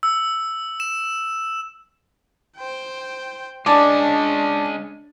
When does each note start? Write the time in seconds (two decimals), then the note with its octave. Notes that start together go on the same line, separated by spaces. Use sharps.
0.03 E6
0.80 E7
2.57 C5 G5
3.66 G#3 C#4 D4 D5 A5 D6